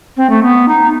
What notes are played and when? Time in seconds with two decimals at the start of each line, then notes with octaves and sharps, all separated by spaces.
0.17 C4
0.30 A3
0.42 B3
0.68 D#4